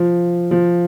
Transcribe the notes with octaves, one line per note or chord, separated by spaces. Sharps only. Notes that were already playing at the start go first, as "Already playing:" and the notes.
Already playing: F3
F3